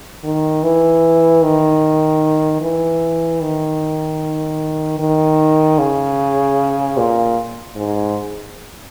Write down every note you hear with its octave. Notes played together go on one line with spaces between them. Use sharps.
D#3
E3
D#3
E3
D#3
D#3
C#3
A#2
G#2